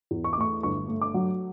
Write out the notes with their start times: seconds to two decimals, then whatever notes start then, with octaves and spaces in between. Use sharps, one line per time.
0.11 E2
0.24 C#6
0.33 D6
0.37 A3 C#6
0.63 G1 C#6
0.88 A3
1.02 D6
1.14 F#3